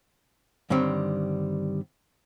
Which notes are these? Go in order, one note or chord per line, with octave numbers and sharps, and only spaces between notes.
G2 D3 D#3 G3 C4 C#5